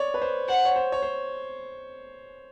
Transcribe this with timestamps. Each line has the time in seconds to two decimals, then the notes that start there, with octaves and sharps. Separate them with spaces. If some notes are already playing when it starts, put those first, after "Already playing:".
Already playing: C#5 D5
0.14 B4
0.22 C5
0.48 C5 F#5
0.65 C#5
0.76 C5
0.92 C#5
1.03 C5